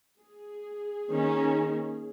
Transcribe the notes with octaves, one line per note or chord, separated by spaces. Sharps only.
G#4
D#3 A#3 C#4